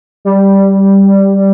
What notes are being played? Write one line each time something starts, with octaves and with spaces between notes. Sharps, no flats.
G3